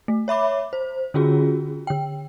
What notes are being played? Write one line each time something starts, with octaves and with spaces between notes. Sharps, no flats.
A3
C#5 E5 B5 D6
C5
D3 C#4 F4 F#4 G#4
D3 G5